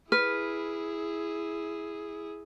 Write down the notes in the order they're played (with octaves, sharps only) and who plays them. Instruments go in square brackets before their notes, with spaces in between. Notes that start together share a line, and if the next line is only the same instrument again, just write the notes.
[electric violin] E4 G#4 [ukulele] B4 [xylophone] F6